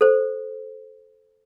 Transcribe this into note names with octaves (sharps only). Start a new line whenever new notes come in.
A4 C5